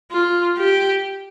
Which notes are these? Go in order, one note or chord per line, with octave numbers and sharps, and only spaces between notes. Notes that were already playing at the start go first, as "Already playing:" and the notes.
F4
G4